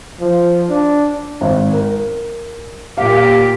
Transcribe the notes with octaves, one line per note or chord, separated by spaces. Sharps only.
F3
D4
G#1
A#4
A#2 G4 F5